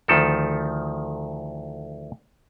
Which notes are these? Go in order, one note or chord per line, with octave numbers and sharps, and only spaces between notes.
D2 D#3 F3 A4